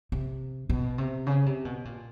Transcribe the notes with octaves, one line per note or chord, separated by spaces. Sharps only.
C3
B2
C3
C#3
C3
B2
A#2